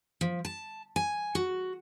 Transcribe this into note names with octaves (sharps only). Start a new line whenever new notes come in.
F3
A5
G#5
F#4